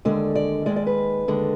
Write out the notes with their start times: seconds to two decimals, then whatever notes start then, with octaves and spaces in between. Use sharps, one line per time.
0.05 D#2 D3 G#3 D5
0.35 D5
0.66 D#2 D#3 G#3 D5
0.76 D5
0.87 B4
1.28 D#2 D3 G#3